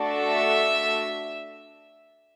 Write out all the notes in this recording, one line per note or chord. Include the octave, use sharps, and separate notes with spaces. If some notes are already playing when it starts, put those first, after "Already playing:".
Already playing: A3 D4 F#4 A4
E5